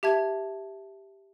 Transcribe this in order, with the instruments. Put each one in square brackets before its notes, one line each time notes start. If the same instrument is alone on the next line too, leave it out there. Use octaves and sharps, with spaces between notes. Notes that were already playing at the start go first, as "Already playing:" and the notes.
[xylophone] G4 E5 A5 G#6